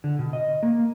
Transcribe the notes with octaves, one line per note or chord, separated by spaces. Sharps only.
D3
B2
D#5
A#3